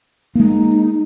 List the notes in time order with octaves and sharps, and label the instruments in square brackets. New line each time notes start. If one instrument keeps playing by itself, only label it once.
[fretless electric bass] G#3 A#3 [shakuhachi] D#4